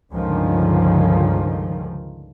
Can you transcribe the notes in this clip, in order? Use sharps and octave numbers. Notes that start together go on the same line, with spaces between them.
C#2 G2 D3 D#3 F3